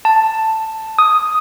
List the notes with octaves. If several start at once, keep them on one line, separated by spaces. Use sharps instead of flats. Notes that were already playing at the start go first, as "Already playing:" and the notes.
A5
D#6